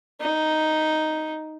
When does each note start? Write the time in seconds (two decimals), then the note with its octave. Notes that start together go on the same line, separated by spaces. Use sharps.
0.21 D#4